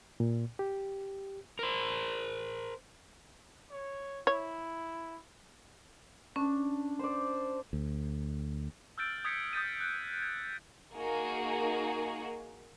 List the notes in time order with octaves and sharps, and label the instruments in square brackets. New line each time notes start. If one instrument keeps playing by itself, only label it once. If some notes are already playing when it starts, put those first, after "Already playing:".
[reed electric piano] A#2
G4
[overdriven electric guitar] A#4 C5
[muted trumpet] C#5
[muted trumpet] E4 [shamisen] C#5
[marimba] C#4 [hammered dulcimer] D4
[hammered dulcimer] C5 D5
[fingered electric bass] D2
[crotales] E6 F6 G6 A6 D7
D#6 G#6 B6 C#7
D#6 G6 A6 D#7
F#6
G#6
[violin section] A#3 D#4 F#4 G#4 A#4